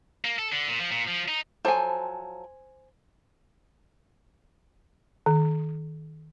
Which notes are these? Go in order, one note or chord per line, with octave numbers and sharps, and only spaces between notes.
A#3
A4
D3
A#2
F3
A#2
F3
D#4
F3 F#3 A4 C5 G#5
D#3